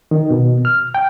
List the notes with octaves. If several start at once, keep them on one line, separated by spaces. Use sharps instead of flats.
D#3
B2
F6
G5